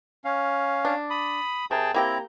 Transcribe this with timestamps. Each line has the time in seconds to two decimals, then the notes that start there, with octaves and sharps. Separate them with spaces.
0.25 C#4 F5
0.85 D4
1.10 B5 D#6
1.71 C3 G#4 A#4 G5 A5
1.94 A#3 C4 E4 G4 G5 A#5